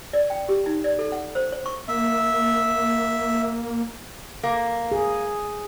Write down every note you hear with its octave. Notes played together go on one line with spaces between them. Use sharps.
D5
G5
G4
D#4
D5
A4
F#5
C5
C#5
C#6
A#3 E5
A#3
G#4